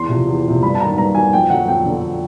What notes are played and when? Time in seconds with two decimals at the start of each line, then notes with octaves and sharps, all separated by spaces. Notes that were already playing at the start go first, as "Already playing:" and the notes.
Already playing: E2 C6
0.09 C3 F3
0.27 E2
0.44 C3 F3
0.63 G2 B5
0.75 A5
0.80 D#3 F#3 A#5
0.97 G2 A#5
1.15 D#3 F#3 G#5
1.33 F2 G5
1.50 D3 F#3 F#5
1.68 F2 G5
1.86 D3 F#3